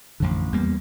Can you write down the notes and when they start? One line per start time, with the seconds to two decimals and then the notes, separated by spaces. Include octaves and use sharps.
0.20 A1 F2 D3
0.52 E2 G3 A#3 B3